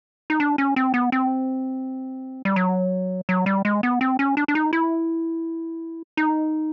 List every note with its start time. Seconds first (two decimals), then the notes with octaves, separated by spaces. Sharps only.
0.30 D#4
0.40 D4
0.58 C#4
0.76 C4
0.94 B3
1.12 C4
2.45 G3
2.56 F#3
3.29 F#3
3.46 G3
3.65 G#3
3.83 B3
4.01 C4
4.19 C#4
4.37 D4
4.48 D4
4.55 D#4
4.73 E4
6.17 D#4